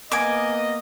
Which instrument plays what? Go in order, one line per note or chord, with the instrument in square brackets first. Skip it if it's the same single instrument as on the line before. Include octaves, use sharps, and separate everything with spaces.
[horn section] A#3 B3 D#5 [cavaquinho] G#5 D6